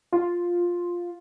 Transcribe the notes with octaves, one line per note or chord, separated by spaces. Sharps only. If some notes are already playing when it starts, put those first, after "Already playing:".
F4